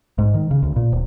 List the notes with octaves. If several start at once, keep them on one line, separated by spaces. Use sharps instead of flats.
G#2
D#3
C#3
D2
A#2
D1